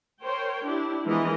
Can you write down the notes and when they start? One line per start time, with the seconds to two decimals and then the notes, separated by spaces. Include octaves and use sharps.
0.23 A#4 C5 C#5 G5
0.65 D4 E4 G4
1.05 E3 F3 G#3 B3 A#4 D#5